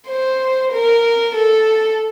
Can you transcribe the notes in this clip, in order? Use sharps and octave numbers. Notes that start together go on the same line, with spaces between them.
C5
A#4
A4